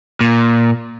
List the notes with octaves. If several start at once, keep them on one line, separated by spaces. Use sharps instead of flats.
A#2